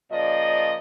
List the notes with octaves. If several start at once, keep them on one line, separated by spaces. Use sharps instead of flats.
A#2 C#3 F3 D5 D#5